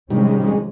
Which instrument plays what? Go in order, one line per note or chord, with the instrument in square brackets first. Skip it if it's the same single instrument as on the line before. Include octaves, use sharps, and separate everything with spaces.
[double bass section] C3 F3 G#3 C#4 [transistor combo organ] D#3 G3
[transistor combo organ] G#3